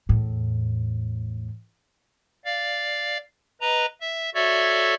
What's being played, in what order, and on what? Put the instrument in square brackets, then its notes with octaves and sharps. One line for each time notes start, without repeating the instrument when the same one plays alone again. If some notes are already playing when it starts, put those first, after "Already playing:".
[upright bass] E2 A2
[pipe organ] D5 F5
B4 D#5 A#5
E5
F#4 A4 C#5 D5 E5